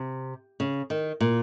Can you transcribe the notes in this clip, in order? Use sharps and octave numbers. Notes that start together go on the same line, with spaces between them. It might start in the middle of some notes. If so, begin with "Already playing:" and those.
Already playing: C3
C#3
D#3
A#2